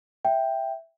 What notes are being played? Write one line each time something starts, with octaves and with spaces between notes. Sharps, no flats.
E5 G5